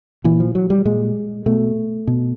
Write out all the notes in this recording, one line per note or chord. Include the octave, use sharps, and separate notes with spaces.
A#2 E3
F3
F#3
G3
A#2 G#3
B2 A3
B2